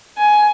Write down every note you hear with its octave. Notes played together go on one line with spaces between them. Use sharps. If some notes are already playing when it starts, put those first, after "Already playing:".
G#5